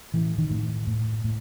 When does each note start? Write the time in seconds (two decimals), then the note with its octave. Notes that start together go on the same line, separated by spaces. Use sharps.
0.14 A2 E3
0.38 D#3
0.51 A2
0.87 A2
1.24 A2